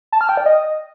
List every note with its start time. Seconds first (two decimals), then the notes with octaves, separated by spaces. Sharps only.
0.12 A5
0.21 F6
0.29 G5
0.37 D5
0.46 D#5